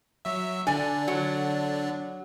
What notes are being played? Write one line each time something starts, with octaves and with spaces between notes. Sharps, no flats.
F#3 E5
D3 D4 D5 G#5
F#3